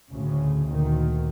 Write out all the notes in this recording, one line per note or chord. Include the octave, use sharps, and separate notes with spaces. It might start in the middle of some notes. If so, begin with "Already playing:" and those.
D2 A2 C#3
D2 A#2 D#3